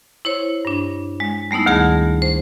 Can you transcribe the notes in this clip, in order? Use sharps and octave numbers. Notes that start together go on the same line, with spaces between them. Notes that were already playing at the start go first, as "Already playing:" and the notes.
E4 C5 C#5
G2 D4
G#3
G3 A3 B3 D#4 E4
D2 D#3 B3 G#4 A5 A#6
C5